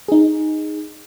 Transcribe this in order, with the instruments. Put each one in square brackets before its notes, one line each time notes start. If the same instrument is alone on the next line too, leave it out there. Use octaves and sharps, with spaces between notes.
[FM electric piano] D#4 G#4